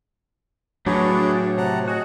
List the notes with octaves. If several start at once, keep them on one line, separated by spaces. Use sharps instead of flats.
A2 F#3 D4 G#4 B4 C#5
C3 F#5 A5 A#5
F#4 G#4 D#5 G#5